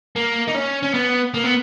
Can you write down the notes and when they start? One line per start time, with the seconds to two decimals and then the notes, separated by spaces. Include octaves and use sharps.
0.16 A#3
0.48 D#4
0.55 C#4
0.83 C#4
0.94 B3
1.34 A#3
1.44 B3